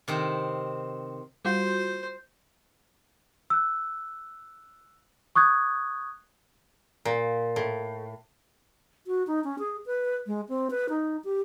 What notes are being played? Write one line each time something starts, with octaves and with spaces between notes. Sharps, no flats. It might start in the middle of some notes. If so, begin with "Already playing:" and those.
C3 D#3 C4
G3 F4 F#4 C5
E6 F#6
C#6 D#6 F#6 G#6
A#2
A2
F#4
D#4
C#4
G#4
B4
G#3
C4
B4
D#4
G4